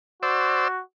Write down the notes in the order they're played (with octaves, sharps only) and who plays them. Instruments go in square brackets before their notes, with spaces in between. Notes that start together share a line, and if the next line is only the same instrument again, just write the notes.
[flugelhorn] F#4 [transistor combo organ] C5 D5 E6